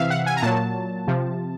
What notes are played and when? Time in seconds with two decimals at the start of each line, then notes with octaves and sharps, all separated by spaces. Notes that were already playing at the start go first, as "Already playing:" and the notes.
Already playing: C3 E3 E5 F5
0.10 F#5
0.26 G#5
0.37 A#5
0.42 A#2 F#3 A5
1.07 C3 F3